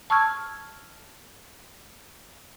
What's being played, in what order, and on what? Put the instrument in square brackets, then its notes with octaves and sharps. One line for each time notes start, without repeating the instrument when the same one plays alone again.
[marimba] A5 C#6 E6 F6 G#6